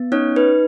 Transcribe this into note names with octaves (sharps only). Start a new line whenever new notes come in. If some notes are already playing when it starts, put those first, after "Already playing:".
Already playing: B3
C#4 D#4 C#5
D#4 B4